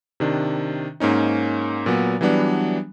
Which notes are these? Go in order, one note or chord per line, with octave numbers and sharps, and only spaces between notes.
C3 D#3 D4
G#2 A#3 C#4 D#4
A#2 F#3 B3
E3 F#3 G3 B3 D4